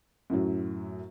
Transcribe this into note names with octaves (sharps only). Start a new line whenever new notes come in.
F#2 A2 F#3